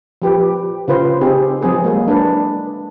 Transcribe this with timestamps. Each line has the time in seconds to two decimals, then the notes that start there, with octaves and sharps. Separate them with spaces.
0.22 F3 G4 B4
0.88 C#3 F4 B4 C5
1.21 C4 D#4 G4 G#4
1.62 F3 F#3 C4 G#4 B4
1.84 F#3 G#3 A#3
2.08 D4 B4